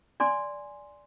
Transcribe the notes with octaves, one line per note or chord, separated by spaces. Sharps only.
D5 G#5 C6